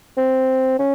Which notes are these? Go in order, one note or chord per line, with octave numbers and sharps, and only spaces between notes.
C4
C#4